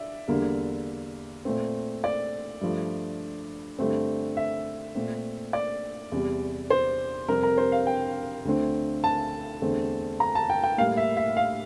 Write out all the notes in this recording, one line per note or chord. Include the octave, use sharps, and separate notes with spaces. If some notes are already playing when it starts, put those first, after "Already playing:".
Already playing: D5 E5
E2 D3 G3 A#3
A#2 A3 C4
D5
G2 F3 A3
G2 D3 A3 C4
E5
A#2 A3 C4
D5
E2 C3 G3
C5
F2 C3 G3 C4 A#4
A#4
C5
F5
G5
D2 D3 A3 C4
A5
E2 D3 A3 C4
A#5
A5
G5
G5
A2 G3 A#3 F5
E5
E5
F5